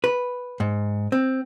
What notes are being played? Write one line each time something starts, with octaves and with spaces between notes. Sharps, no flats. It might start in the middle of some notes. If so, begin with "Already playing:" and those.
B4
G#2
C4